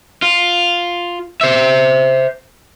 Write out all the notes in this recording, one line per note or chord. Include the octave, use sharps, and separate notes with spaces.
F4
C5 E5